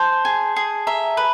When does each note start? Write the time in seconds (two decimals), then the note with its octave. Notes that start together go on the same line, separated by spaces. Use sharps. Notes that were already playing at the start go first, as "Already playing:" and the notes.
Already playing: C5 A5
0.25 G#4
0.56 G#4
0.87 E5 A#5
1.17 B4